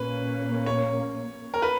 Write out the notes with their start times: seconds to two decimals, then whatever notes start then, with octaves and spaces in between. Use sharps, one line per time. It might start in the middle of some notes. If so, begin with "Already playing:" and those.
Already playing: A#1 A#2 A#3 C#4 B4
0.66 C#5
1.54 A#4
1.62 B4